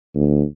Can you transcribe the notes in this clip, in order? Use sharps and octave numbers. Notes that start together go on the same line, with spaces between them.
D2